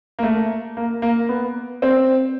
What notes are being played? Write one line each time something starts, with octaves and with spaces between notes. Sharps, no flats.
A#3
A3
A#3
A#3
B3
C4